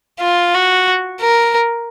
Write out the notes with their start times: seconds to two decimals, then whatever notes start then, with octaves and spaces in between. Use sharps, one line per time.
0.20 F4
0.54 F#4
1.21 A#4